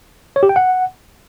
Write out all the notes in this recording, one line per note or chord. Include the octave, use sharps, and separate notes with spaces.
C#5
G4
G5
F#5